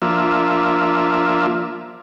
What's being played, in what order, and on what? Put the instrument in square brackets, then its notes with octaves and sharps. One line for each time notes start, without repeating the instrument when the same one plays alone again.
[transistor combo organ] F3 A#3 D4 F4 E5